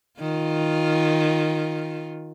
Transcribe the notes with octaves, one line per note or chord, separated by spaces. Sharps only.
D#3 F4